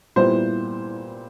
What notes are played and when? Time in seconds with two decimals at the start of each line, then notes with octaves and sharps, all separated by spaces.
0.16 A#2 G3 B3 E4 C5